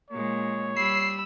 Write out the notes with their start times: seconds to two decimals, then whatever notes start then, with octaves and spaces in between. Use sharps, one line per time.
0.11 A#2 G#3 C#5
0.77 G3 B5 E6 C7